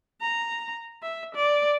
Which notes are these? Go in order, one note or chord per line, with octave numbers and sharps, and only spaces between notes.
A#5
E5
D5